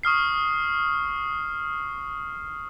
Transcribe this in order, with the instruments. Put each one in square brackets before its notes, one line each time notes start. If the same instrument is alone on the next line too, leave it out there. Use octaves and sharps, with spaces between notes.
[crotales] C#6 D#6 F6 C7